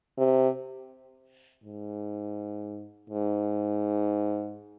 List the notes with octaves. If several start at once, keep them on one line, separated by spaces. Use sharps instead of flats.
C3
G#2
G#2